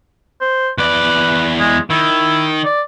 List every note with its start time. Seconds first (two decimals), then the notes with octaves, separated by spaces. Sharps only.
0.41 C5
0.78 E2 B4 D5
1.59 G#3
1.90 D#3 E4
2.65 D5